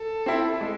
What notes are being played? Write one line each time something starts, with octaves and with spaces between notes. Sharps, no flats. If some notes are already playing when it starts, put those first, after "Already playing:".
Already playing: A4
C4 E4
G#3